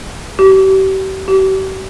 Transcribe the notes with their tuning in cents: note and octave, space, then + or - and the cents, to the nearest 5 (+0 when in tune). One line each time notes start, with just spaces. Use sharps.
G4 -40
G4 -45